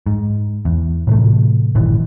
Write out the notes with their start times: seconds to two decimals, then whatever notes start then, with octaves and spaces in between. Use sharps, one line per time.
0.06 G#2
0.65 E2
1.07 A2 C3 E3 A3
1.75 G1 A#2 D#3 E3